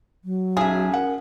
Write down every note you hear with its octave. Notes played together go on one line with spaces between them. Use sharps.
F#3
B1 C#4 G#4 E5
A#4 F#5